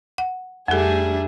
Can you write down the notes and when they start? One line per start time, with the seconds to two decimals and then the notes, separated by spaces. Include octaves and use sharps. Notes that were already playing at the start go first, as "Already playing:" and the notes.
0.18 F#5
0.68 F2 G3 A3 D4 G#4 A4 E5